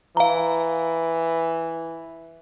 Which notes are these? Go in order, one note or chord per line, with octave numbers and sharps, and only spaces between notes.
E3 F5 A#5